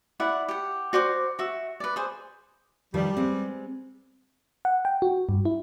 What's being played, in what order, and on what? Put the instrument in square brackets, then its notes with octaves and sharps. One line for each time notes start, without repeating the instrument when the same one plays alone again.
[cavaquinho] E4 D5 F#5
G4 F#5
F#4 C5 D5 D6
F#4 E5
B4 D5
G#4 C5
[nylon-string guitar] D#3 F3 B4 [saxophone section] G3
[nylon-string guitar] G#3 B3 C4
[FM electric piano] F#5
G5
F#4
G2
E4